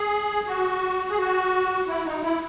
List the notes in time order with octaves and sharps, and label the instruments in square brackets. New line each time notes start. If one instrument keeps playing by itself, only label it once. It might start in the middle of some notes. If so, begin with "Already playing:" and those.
Already playing: [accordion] G#4
F#4
G#4
F#4
E4
D#4
E4